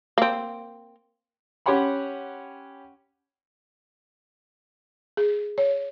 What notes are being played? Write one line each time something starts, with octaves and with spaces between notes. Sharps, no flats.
A#3 C4
C#4 G4 C#5 F#5 B5 C6
G#4
C#5